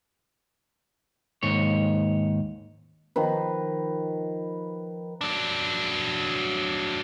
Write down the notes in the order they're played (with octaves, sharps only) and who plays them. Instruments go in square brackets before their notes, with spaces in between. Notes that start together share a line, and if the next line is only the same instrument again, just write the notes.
[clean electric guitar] D#2 G#2 C#5
[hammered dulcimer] D#3 F3 B4
[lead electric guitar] F#3 D4